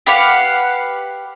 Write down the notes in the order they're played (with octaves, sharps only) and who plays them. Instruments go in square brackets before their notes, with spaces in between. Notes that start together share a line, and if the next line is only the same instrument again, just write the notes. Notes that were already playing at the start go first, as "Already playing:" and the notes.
[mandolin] G4 B4 F5 F#5